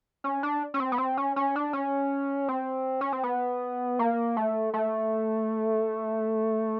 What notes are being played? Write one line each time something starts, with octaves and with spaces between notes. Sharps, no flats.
C#4
D4
C#4
C4
B3
C4
C#4
C#4
D4
C#4
C4
C#4
C4
B3
A#3
A3
A3